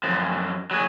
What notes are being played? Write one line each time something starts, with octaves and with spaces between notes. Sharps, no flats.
F#2 F3
F#3 G#4